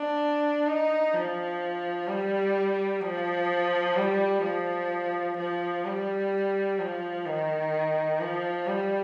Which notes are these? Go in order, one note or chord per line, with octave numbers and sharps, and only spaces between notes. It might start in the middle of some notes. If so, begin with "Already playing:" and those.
Already playing: D4
D#4
F3
G3
F3
G3
F3
F3
G3
F3
D#3
F3
G3